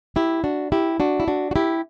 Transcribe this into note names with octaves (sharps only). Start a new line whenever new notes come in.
E4 G4
D4 F#4
E4 G4
D4 F#4
E4
D4 F#4
F#4
E4 G4